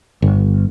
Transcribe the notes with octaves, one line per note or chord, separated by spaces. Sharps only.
G1